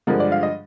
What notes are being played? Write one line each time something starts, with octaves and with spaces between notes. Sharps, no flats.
G2 D3 F3 G#3 A#4
D5
F5
D#5